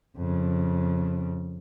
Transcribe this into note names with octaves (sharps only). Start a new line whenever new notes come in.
F2 C#3